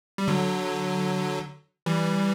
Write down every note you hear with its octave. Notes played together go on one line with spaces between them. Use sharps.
G3
D3 F#3
E3 G3